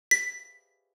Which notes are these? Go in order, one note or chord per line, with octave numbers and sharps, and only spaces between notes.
B6